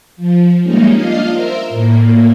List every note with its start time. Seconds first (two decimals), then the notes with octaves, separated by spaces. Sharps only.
0.16 F3
0.63 G3 G#3 A#3 C#4 D#4
0.95 D4 F4 D#5 F5 C7
1.31 A#4 C5 E5
1.69 A2 A#3